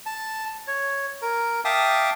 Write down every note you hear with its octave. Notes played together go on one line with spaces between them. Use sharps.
A5
C#5
A#4
E5 F5 G5 A5 D6 D#6